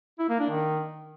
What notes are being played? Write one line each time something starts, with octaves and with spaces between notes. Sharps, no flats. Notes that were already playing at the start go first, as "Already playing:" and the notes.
E4
A#3
D4
D#3